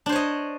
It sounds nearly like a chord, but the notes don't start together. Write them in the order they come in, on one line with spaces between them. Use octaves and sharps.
D4 C5 C#5 D#5